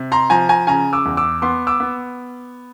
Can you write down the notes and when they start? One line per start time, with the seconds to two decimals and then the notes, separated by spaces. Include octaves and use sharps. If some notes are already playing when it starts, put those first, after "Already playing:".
Already playing: C3
0.12 A#5 C6
0.30 F3 G#5 A#5
0.49 G#5 A#5
0.67 C#3 G#5 A#5
0.93 D6 E6
1.05 E2
1.17 D6 E6
1.42 B3 C6 D6
1.67 D6 E6
1.80 B3